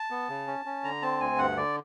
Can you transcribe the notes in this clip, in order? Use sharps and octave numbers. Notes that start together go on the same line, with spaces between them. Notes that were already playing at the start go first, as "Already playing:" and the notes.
Already playing: A5
B3
C#3
C#4
C#4
D3 A#5
C4 A5
D2 G#5
G2 F#5
D3 D5